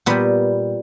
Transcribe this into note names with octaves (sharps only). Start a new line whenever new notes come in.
A#2 G3 B3